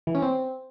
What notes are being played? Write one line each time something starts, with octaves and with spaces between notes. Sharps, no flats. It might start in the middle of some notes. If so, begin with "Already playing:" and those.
E3
C#4
C4